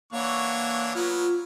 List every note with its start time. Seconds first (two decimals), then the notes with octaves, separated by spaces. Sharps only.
0.13 E3 A#3 D4 C#5 F#5 C#6
0.95 F#3 B3 F4